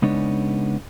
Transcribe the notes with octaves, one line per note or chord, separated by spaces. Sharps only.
C#3 G#3 B3 D4 D#4 C#5